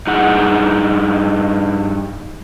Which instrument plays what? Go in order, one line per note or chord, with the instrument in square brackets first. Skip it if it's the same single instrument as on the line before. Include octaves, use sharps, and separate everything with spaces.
[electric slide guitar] G2 D#4 G#4 F#5